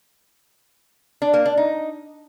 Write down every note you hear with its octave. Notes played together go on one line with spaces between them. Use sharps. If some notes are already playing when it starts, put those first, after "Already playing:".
D4
A#3
D4
D#4